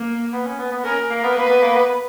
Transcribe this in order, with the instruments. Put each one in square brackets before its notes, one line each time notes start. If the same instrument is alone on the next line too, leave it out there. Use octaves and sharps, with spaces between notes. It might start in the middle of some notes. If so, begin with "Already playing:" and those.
Already playing: [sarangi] A#3
[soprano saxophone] B3
C#4
B3
B3
[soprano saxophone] C#4 [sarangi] A#4
[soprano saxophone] A#3
B3
[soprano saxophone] A#3 [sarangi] B4
[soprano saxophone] B3
A#3
B3